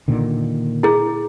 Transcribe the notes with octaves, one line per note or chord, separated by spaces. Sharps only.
A#2 D3 D#3
E4 G#4